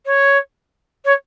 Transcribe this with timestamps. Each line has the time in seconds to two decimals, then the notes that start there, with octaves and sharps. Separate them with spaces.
0.06 C#5
1.05 C#5